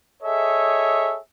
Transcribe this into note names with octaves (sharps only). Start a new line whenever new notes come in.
G#4 A4 C#5 D#5 E5